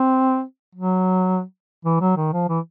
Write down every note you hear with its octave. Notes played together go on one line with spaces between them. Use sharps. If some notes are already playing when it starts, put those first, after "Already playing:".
Already playing: C4
F#3
E3
F#3
D#3
F3
E3